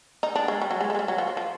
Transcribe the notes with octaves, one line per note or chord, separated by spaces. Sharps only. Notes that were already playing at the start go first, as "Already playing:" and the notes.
D#4
D4
G#3
G3
F#3
G#3
A3
G#3
G3
F#3
F3
F#3
F3